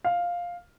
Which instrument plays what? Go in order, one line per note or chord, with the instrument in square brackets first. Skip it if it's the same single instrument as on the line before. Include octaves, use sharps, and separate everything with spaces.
[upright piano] F5